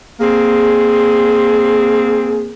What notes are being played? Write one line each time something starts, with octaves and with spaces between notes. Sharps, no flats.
A#3 C4 G#4